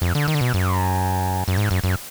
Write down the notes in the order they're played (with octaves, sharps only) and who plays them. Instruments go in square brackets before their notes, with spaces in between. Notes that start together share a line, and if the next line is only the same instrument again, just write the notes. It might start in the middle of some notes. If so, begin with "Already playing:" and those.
[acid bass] F2
D3
D#3
D3
B2
F#2
F#2
G#2
F#2
F#2